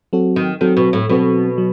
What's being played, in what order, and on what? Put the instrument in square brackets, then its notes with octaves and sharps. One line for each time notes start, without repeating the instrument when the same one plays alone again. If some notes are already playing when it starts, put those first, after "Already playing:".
[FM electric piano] F#3 C4 F#4 A4
[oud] D#3
[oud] D#3 [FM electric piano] F#3 C4 F#4 A4
[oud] B2
A2
[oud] B2 [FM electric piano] F#3 C4 F#4 A4
[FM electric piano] F#3